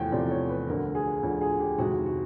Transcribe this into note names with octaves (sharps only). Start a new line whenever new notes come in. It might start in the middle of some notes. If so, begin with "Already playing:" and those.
Already playing: E2 C3 F3 A3 C4 G5 G#5
E2 C3 F3 A3 C4 D5
C#5
B4
D2 D3 F3 A#4
G#4
D2 D3 F3
G#4
G4
F2 C3 D#3 G#3 F#4
F#4